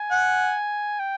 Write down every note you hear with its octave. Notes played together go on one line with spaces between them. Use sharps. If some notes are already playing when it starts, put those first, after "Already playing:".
Already playing: G#5
F#5
G5